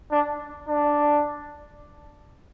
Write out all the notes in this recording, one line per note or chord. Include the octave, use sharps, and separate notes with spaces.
D4
D4